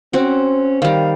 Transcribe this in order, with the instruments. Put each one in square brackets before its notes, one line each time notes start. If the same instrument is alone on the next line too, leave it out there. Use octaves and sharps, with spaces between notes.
[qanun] C4 F#4 [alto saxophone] C#4
[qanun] D#3 G3 [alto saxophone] F5